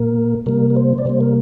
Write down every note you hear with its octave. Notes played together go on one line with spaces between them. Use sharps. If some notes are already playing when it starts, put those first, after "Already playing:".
Already playing: A#2 A#3 A#4
C3 G3 A#3 A#4
A#4
C5
D5
C3 G3 A#3 C5
A#4